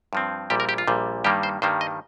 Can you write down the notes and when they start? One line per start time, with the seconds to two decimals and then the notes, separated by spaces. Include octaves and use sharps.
0.13 G2 F3 C4
0.50 A#1 A#2 G3 G4
0.60 A#4
0.69 G4
0.78 F4
0.88 A#1 A#2 G3
1.24 G2 D#3 G3 A#3 G4
1.43 C5
1.62 G2 D#3 G3 A#3 C5
1.81 D#5